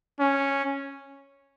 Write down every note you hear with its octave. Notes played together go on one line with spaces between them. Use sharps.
C#4